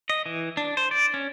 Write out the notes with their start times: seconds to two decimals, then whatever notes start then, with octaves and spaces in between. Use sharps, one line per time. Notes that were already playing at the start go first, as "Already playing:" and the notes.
0.10 D#5
0.26 E3
0.57 D4
0.77 C5
0.91 D5
1.14 C#4